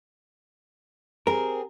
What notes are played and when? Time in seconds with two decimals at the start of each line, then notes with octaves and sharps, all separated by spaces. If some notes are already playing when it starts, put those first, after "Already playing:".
1.27 C4 G4 G#4 A#4